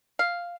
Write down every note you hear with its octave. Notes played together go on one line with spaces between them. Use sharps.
F5